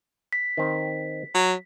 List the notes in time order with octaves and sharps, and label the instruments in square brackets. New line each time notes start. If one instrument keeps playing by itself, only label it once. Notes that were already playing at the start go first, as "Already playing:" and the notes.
[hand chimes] B6
[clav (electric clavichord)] D#3 C4
[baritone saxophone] F#3